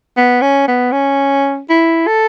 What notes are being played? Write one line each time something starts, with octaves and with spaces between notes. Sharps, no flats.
B3
C#4
B3
C#4
E4
A4